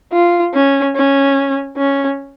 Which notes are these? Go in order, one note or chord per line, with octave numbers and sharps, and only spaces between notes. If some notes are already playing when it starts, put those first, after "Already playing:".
F4
C#4
C#4
C#4